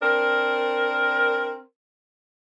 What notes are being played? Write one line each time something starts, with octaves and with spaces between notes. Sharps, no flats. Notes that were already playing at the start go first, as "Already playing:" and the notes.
C4 D4 A#4